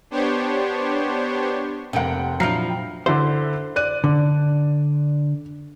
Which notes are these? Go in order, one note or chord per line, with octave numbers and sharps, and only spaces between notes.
B3 D4 G4 C5 C#5
F1 C3 A#3 F#5 G5 D7
A#2 F3 F#3 D4 E4 A#5 F6 C7
G5
D3 E4 C5
D5 F#6 D#7
D3